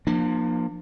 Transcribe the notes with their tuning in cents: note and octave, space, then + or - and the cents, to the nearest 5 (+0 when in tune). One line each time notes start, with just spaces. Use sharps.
F3 +0 A#3 +20 D4 +45